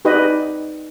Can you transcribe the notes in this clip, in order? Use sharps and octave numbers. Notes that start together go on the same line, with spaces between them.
D#4 G4 B4 D5 D#5